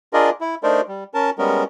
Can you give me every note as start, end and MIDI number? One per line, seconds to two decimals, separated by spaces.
0.13 0.30 62
0.13 0.30 65
0.13 0.30 68
0.13 0.30 70
0.13 0.30 74
0.13 0.30 75
0.41 0.55 64
0.63 0.81 57
0.63 0.81 62
0.63 0.81 63
0.63 0.81 70
0.63 0.81 72
0.63 0.81 74
0.88 1.04 55
1.14 1.30 61
1.14 1.30 70
1.14 1.30 81
1.38 1.64 55
1.38 1.64 56
1.38 1.64 59
1.38 1.64 61
1.38 1.64 70